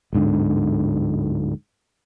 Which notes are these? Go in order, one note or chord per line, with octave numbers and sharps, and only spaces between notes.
D1 G#2 D3